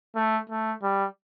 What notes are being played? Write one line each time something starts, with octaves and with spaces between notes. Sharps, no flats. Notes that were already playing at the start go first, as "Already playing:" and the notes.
A3
A3
G3